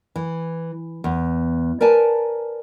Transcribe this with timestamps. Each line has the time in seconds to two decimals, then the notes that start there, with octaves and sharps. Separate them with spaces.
0.16 E3
1.04 E2
1.81 A#4 B4 D5 G#5 A5